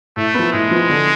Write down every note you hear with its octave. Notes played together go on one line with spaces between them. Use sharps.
A2 A3
F3 B3
A2 G#3
F3 B3
D3